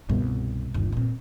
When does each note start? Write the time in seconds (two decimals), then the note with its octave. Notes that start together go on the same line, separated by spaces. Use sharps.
0.09 C2 G2 B2
0.74 G1 D#2
0.92 A#2 C4